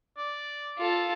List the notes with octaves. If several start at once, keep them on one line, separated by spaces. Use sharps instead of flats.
D5
F4 A4